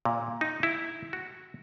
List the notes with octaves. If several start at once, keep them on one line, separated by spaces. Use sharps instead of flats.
A#2
D#4
E4
F#4